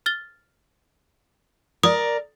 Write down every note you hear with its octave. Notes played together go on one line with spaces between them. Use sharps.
F6 A6 G7
A#4 D5 D#6